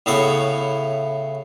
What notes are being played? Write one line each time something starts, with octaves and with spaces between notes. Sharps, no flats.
A2 C#3 B3 E4 C#5